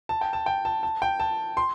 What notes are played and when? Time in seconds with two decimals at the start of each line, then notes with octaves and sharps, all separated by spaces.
0.09 A5
0.21 G5
0.33 A5
0.46 G5
0.65 A5
0.83 A5
1.02 G5
1.20 A5
1.57 C6